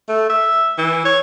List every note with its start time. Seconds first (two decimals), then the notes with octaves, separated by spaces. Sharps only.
0.09 A3
0.30 E5
0.78 E3
1.05 C#5